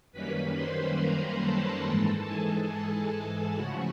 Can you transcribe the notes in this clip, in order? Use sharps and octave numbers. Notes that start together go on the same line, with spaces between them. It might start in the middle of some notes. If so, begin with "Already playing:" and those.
F#2 D#3 G3 A#3 C#4 B4 B5
C5 C6
A#4 A#5
A4 A5
G#2 E3 G#3
G#4 G#5
C#3 F3 A3 C#4 E4 F#4 F#5